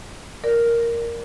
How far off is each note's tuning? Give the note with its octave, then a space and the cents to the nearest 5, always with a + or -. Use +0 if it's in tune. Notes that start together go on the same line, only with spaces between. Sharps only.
A#4 +0 D5 +0